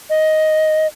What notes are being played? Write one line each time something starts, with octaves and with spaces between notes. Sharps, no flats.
D#5